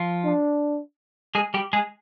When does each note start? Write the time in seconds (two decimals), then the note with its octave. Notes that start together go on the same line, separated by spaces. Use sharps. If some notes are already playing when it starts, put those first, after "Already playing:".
Already playing: F3 F4
0.24 D4
1.35 G#3 G#4
1.54 G3 G4
1.73 G#3 G#4